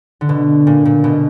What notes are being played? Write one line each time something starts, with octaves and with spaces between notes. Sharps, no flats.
D3
B2
A#2
A#2
B2